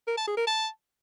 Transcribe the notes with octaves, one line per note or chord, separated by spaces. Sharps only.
A#4
A5
G#4
A#4
A5